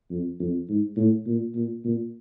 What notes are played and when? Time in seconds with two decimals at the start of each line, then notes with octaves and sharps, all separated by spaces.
0.10 F2
0.39 F2
0.68 G#2
0.97 A2
1.26 A#2
1.55 A#2
1.85 A#2